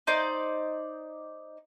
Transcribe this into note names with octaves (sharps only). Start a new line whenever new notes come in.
D#4 C5 D5